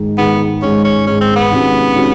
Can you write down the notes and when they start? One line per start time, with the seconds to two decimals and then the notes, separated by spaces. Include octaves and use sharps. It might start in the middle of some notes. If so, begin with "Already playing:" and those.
Already playing: G#2 D#3 G#3
0.18 G#2 D#3 G#3 B3
0.62 G#2 D#3 G#3 C#4
0.85 C#4
1.07 G#2 D#3 G#3 C#4
1.21 C4
1.36 B3
1.51 C3 D#3 G#3 C#4 F#4
1.95 C3 D#3 G#3 C#4 F#4